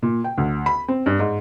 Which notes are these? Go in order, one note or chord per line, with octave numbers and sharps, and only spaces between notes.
A#2
G5
D2
B5
C4
G2
G#2